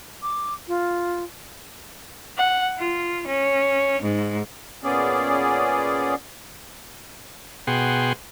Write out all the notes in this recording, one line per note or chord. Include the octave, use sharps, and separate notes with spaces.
D6
F4
F#5
F4
C#4
G#2
A#2 B3 C#4 G#4 D5
B2 G#4 F#5 G5 C6